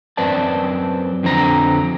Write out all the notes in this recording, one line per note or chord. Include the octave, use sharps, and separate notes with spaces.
F#2 C4 B4 D5 A5
F2 D3 C4 A#5